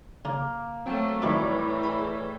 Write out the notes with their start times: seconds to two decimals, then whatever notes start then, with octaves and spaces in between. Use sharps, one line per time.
0.25 C#3 A#3
0.86 F#3 A3 C4 G5 A5
1.22 F#2 A2 D#3 E3 G3 C#5 E5 D6
1.83 G#4 B5